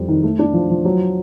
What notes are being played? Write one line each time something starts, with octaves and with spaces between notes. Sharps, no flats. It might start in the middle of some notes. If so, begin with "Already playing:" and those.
Already playing: F2 G3
D#3
A3
D4
F3
F3
F#3